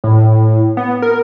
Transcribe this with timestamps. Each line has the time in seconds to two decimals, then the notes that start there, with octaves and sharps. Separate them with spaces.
0.04 A2
0.77 B3
1.02 A#4